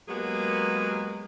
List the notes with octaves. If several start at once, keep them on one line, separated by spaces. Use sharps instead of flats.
F#3 G#3 A#3 B3 G4 G#4